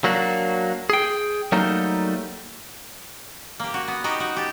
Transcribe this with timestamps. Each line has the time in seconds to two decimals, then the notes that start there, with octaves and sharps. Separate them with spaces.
0.04 F#3 A#3 D4 F#4
0.90 G#4 G5
1.52 F#3 G3 A3 A#3 D#4
3.60 A#3 G4
3.74 F#4
3.88 B3
4.04 D#4 F#4 G4
4.20 F#4
4.36 G4 A5